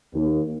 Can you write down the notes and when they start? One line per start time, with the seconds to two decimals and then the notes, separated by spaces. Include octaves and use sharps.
0.14 D#2